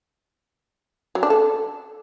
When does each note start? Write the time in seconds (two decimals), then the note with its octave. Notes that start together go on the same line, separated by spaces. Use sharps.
1.15 F#3
1.23 D4
1.30 A4